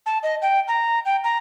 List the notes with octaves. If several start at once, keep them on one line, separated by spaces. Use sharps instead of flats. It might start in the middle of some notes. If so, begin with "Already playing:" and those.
A5
D#5
G5
A#5
G5
A#5